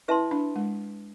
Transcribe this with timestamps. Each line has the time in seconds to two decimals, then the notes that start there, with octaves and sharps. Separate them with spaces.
0.08 E4 B4 E5 A5 C6
0.31 D4
0.56 G#3